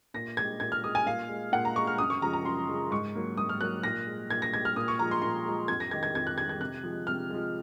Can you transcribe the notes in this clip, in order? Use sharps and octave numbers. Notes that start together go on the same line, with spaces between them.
A#2 A#6
G#3 G#6
A#2 G#6
F6
G#3 D#6
G#5
A#2 F5
G#3
A#2 F#5
A#5
G#3 C#6
F6
F#2 D#6
C#6
C#3 F3 G#3 A#5
A#5
F#2 C6
C#3 F3 G#3
G#2 C#6
F#3 A#3
G#2 D#6
F6
F#3 A#3 F#6
A#2 A#6
G#3
A#2 G#6
A#6
G#3 G#6
F6
A#2 D#6
C#6
F3 G#3 A#5
C6
A#2 C6
F3 G#3
F2 G#6
A#6
D#3 G#3 G#6
G#6
F2 G#6
F#6
D#3 G#3 G#6
G#6
C3 F#6
F3 G#3
C3 F6
F3 G#3